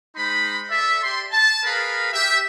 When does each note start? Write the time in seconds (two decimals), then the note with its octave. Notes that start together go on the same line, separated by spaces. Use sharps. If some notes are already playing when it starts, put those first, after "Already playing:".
0.16 G#3 D#4 C5 B5
0.70 A4 D5 E5
1.02 G4 D5 C6
1.31 A5
1.64 G#4 A#4 B4 F5 B5
2.12 G4 E5